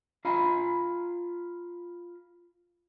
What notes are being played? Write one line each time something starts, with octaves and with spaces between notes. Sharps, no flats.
F4 F5 G#5 A#5 B5